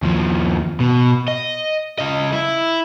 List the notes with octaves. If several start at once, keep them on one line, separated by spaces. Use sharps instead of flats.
D#2 F3
B2
D#5
C#3 D#5
E4